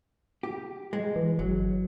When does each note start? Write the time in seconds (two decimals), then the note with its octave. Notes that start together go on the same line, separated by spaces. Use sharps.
0.43 G4
0.93 G#3
1.16 E3
1.39 G1 F#3